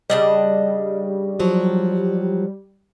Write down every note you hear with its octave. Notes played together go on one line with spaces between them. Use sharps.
C#3 G3 D4 D#5
F3 F#3